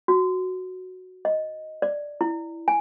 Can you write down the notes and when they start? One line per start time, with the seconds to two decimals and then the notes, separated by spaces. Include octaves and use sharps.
0.08 F#4
1.25 D#5
1.82 D5
2.21 E4
2.68 G#5